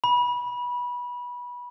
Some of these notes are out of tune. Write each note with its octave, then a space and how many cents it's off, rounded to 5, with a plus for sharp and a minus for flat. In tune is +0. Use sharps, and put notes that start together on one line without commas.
B5 -20